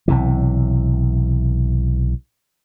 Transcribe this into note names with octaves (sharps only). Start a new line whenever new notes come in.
B1 C3 E3